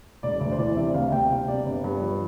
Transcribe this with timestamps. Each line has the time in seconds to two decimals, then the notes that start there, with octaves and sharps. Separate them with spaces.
0.23 E1 D5
0.41 D2 D5
0.52 C5
0.59 E3 D5
0.76 C3 E5
0.94 D2 F5
1.12 C3 G5
1.30 C3 F5
1.48 C3 D5
1.66 G1
1.84 G2
2.02 F3